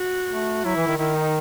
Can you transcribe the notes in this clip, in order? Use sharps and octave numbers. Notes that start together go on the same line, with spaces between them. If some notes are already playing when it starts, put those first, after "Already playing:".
Already playing: F#4
A3
F#3 E4
E3
D#3
D#3 E4
D#4